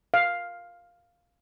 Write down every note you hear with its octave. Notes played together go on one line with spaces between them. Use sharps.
F5